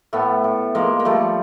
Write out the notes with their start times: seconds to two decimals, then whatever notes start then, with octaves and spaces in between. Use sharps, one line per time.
0.13 A2 A3 B3
0.44 A2
0.75 F3 G#3 A#3
1.00 A#3
1.05 F3 G3 A3